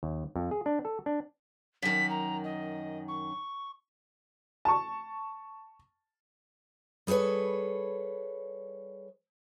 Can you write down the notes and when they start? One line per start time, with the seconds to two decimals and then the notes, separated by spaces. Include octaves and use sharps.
0.03 D#2
0.36 F2
0.51 G#4
0.66 D4
0.85 A4
1.06 D4
1.83 F#2 D#3 B6
2.10 A#5
2.44 D#5
3.08 C#6
4.65 A5 C#6
7.07 G3 G#4 A4 B4 C#5